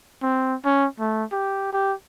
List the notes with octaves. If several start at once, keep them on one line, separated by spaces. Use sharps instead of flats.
C4
C#4
A3
G4
G4